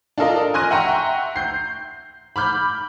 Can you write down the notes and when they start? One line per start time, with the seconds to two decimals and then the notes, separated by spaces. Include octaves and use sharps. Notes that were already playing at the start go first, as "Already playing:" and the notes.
0.18 D4 F4 A4 A#4 D#5
0.54 G#5 C6 F6 F#6 A#6 D#7
0.70 E5 F#5 G5 A#5 C6 C#6
1.36 G6 C7
2.36 B5 D6 F6 G6